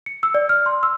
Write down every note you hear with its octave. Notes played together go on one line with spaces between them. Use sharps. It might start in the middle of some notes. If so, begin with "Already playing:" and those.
C#7
E6
D5
F6
C6
E6